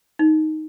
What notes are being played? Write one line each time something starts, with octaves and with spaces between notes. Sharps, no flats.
D#4